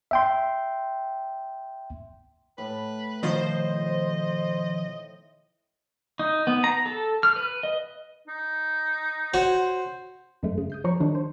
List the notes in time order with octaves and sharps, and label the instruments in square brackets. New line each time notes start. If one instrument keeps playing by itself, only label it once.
[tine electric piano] E5 G5 C6
[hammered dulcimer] A2 [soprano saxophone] B4
[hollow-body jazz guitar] B2 D#3 F3 [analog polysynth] C5 [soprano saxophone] D#5
[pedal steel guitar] D#4
B3
A#5
A4
F6
B4
D#5
[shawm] D#4
[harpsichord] F#4 C#5 [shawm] C5
[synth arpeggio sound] F#2 G#3 A3
C#3
D#6 G6 C7
F3 C#5 A#5 C#6 C7
D#3 G3 D4 D#4
C5